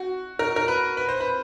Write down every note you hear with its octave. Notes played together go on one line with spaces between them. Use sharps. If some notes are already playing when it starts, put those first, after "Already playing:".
Already playing: F#4
A#4
A#4
B4
B4
C5
B4